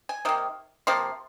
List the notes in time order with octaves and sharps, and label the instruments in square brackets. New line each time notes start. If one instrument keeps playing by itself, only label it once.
[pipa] G#5
C3 D#3 A#3
C3 F3 A#3 C6